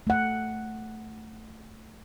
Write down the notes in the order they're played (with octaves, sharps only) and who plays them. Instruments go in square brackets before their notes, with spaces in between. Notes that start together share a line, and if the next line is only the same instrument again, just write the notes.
[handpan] A3 F#5